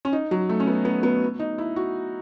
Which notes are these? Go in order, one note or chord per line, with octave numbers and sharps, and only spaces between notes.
C#4
D#4
F#3
A3
C#4
B3
B3
B3
D#4
E4
F#4